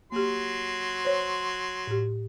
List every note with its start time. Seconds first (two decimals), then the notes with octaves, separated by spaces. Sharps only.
0.12 F#3 A#3 G4 C6
1.05 C5 C#5
1.87 A2 G4